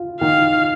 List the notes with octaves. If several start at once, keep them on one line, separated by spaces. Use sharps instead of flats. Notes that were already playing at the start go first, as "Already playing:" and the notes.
Already playing: F4
D#3 F5